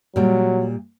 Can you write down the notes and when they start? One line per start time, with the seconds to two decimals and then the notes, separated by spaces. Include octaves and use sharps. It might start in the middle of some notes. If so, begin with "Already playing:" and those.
0.16 A#2 F#3 G3